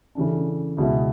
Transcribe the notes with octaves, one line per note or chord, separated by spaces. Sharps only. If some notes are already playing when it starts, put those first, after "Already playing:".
C#3 E3 A3 D4
C#2 B2 G#3 B3 E4